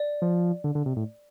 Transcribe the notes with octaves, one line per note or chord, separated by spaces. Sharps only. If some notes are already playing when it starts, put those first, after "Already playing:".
Already playing: D5
F3
D3
D3
C3
A2